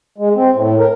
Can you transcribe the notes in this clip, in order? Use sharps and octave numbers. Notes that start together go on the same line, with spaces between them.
G#3
C4
A2
A#4